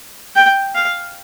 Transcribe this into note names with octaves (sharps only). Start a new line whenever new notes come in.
G5
F5